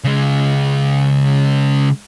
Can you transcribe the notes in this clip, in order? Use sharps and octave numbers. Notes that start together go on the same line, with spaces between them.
C#3 G#3